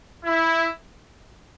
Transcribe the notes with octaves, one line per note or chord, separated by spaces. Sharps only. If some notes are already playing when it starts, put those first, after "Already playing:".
E4